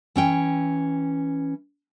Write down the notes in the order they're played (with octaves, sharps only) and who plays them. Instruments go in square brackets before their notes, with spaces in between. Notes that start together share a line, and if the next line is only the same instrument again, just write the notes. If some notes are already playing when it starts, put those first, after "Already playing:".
[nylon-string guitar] E3 C#4 G5